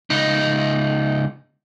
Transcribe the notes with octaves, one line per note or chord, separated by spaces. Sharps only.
C#2 D#4